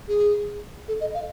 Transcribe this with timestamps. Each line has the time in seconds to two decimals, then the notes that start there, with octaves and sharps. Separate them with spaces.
0.08 G#4
0.88 A4
1.01 D#5
1.14 F5